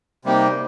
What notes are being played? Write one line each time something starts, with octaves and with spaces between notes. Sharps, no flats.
C3 G3 A#3 D#4 G4